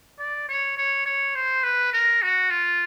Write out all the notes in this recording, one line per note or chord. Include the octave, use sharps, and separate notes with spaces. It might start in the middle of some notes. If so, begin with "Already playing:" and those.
D5
C#5
C#5
C#5
C5
B4
A#4
F#4
F4